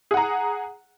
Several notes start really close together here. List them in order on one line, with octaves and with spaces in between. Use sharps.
G#4 F#5 A#5